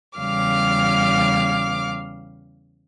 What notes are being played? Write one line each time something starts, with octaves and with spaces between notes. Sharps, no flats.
E2 C#3 G3 F5 D6 F6